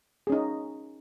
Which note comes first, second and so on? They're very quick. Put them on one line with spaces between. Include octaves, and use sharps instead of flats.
G#4 C#4 D#4